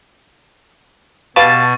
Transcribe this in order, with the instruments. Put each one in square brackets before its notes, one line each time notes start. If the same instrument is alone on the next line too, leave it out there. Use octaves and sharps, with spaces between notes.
[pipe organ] B2 [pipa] G4 B4 F5 [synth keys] A5 [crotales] C#6 A6